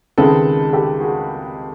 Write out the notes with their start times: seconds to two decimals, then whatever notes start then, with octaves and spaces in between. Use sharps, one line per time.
0.18 C#2 C3 D#3 G#3 A4 B4
0.73 G4 A4
1.01 F#4 G#4